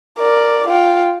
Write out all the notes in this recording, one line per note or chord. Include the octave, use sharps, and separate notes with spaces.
A#4 D5
F4 G5